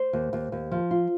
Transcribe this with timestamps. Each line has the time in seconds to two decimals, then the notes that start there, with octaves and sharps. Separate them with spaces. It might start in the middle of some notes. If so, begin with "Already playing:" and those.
Already playing: C5
0.13 D#2
0.33 D#2
0.52 D#2
0.72 F3
0.91 F4